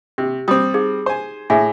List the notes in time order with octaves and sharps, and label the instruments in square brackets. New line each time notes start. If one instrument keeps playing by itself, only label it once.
[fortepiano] C3 [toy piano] G4
[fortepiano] G3 C4 [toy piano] D#6
[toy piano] D#4 G#4
[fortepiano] C5 G#5
[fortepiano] A2 [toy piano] G#4 E5 G#5